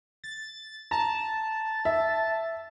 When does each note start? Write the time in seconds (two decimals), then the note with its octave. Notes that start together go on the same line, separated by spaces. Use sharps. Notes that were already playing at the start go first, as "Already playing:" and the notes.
0.24 A6
0.91 A5 A#5
1.85 E5